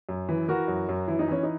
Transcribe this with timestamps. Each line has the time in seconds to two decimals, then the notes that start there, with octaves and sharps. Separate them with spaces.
0.09 F#2
0.29 E3
0.48 E3 F#4 A#4
0.68 F#2
0.89 F#2
1.08 E3 E4
1.19 D#4
1.28 E3 C#4
1.43 D#4